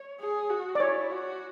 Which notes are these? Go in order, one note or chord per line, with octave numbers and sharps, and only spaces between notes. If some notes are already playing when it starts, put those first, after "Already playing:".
Already playing: C#5
G#4
F#4
D5
E4 C#5
F#4